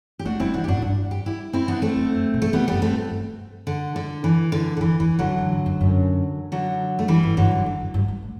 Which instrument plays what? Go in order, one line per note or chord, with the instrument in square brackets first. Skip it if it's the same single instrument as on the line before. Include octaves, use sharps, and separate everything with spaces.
[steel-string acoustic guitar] G4
[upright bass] A3 [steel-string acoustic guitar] D4 F#4
[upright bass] G3 [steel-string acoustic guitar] C4 E4
[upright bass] E3 [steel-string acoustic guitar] D4 F#4
[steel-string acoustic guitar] G4
[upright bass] F#2 [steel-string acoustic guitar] D4 F#4
[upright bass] A2
G2
[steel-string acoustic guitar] G4
E4 G4
C4 E4
B3 D4
A3 C4
[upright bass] F#2
F#2
B2
[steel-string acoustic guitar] A3
[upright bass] E2 [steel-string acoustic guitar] G3 B3
[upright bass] F#2 [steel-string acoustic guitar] G3 B3
[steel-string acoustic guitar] A3 C4
[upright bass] A2
G2
[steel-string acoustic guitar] D3
D3
E3
D3
D3
[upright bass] E2 [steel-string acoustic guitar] E3
[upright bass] E2 [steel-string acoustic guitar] E3
[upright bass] F#2 [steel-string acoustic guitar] D3 F#3
[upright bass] F#2
G2
F#2
F#2
[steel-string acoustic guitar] D3 F#3
A3
[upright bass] G2 [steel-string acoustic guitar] E3 G3
[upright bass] G2
[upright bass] G2 [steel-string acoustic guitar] D3 F#3
[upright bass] F#2
E2
F#2
G2
G2
A2